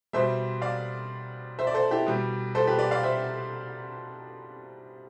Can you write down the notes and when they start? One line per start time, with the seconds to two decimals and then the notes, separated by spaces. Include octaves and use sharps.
0.13 B2 G3 C5 E5
0.62 D5 F5
1.59 C5 E5
1.67 D5
1.74 A4 C5
1.91 E4 G4
2.06 B2 G3
2.55 A4 C5
2.67 G4 B4
2.79 B4 D5
2.91 D5 F5
3.03 C5 E5